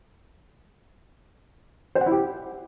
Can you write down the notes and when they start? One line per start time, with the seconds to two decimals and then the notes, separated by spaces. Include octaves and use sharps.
1.95 C5
2.01 F#5
2.06 E4
2.12 G4